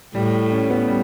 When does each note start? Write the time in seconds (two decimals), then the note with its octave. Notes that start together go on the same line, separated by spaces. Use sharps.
0.15 A2 G3
0.52 C#4
0.70 B3
0.88 G3